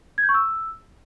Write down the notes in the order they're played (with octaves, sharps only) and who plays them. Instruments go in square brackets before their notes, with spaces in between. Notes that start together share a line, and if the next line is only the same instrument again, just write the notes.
[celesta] G#6
G6
C#6
E6